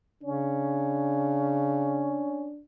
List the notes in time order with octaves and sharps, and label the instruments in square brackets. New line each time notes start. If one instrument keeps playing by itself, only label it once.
[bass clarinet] C#3 [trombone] C#4 [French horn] D4